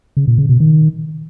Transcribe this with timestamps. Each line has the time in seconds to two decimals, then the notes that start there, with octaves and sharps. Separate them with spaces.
0.17 C#3
0.28 A#2
0.38 C#3
0.49 B2
0.60 D#3